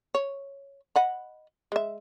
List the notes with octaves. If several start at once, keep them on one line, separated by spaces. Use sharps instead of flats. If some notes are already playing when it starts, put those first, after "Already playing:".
C#5
D#5 F#5 B5
G#3 E5